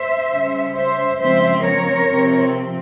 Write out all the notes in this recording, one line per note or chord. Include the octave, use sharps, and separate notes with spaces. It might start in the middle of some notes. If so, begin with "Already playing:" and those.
Already playing: C5 E5
C#3 G3 C#4
C5 E5
C#3 F3 G#3 C4 C5 E5
A#4 C#5
C3 F3 C4